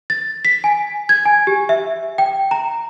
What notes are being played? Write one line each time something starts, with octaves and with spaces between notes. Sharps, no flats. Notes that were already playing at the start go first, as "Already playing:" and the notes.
A6
B6
G#5
G#6
G#5
G4
E5
G5
A#5